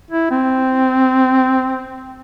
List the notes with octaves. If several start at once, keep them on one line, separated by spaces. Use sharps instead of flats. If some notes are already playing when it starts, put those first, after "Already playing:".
E4
C4